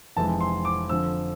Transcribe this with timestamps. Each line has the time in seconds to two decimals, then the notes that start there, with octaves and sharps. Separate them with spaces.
0.16 F1 F2 E3 G#3 C4 A5
0.41 C6
0.65 D6
0.89 F2 D3 F3 E6